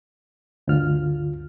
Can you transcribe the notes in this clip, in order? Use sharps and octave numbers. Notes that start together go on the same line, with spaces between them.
D2 G2 D3 F4 F6